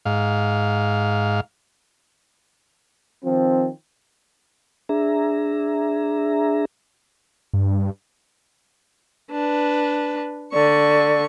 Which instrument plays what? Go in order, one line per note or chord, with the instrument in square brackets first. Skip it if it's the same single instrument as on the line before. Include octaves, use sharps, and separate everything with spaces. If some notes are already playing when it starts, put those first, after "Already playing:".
[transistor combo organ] G#2 F5
[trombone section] D#3 F3 C4
[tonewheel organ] D4 G#4 E5 A#5
[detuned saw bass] G2
[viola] D4 B4
[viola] D3 C#6 [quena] D5